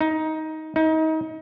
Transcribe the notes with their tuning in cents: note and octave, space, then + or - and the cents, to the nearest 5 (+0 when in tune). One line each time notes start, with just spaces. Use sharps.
D#4 +15
D#4 +30